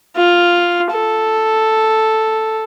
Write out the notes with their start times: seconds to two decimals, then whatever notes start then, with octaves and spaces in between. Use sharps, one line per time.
0.16 F4
0.91 A4